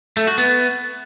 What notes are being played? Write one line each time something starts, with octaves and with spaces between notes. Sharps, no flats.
A3
F#4
B3